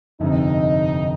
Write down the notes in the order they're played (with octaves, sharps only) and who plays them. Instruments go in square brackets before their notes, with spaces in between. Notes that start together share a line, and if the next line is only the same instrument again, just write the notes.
[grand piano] G1 F2 C3 [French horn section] D#4